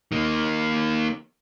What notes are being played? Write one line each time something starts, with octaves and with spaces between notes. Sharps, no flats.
D#3 A#3